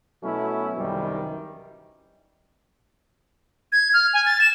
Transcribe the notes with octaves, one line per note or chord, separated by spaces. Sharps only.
B2 F#3 A3 B3 C#4 E4
C2 F#2 C3 D#3 E3 G3
G#6
F6
G#5
A6
E7